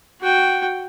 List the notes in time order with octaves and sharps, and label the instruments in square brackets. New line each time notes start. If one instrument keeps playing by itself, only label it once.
[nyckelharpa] F#4 G5